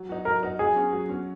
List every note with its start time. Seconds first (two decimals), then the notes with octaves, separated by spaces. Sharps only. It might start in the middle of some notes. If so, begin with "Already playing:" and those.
Already playing: F#3
0.09 D#4 F#4
0.25 F#3 A#4
0.43 D#4 F#4
0.59 F#3 G#4
0.76 C#4 F#4
0.93 F#3
1.09 C#4 F#4